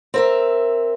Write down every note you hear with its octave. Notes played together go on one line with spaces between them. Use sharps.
C4 A#4 E5